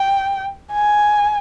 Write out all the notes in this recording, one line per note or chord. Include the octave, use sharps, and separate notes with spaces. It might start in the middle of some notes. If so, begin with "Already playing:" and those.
Already playing: G5
G#5